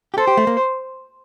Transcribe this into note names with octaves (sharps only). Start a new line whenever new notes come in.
G4
A4 C5
G4
A3
A#3